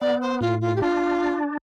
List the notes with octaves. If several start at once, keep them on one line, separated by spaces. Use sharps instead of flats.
B3 D5
C5
A2 F4
F4
G4
D4 F4